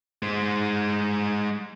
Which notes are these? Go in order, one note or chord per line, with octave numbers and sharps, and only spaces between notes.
G#3 C5